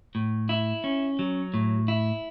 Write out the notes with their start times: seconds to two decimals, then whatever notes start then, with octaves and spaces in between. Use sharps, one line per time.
0.15 A2
0.49 E4
0.84 C#4
1.19 F#3
1.54 A2
1.88 E4